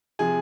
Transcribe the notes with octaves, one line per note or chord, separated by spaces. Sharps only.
C3 F3 G#4 G#5